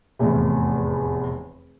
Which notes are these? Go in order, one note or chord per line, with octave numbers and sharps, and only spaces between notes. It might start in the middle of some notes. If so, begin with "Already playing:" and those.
F1 E2 A2